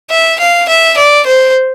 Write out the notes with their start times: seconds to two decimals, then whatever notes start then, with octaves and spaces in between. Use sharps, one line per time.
0.10 E5
0.39 F5
0.68 E5
0.97 D5
1.26 C5